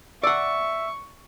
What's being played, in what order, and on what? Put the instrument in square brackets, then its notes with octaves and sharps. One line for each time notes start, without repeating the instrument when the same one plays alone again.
[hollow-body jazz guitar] D5 F#5 [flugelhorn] E5 [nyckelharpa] C#6 [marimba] E6